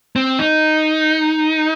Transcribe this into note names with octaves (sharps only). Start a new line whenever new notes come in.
C4
D#4